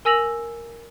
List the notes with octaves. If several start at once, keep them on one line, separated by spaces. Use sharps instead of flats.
A#4 G#5 E6 A#6 F7 F#7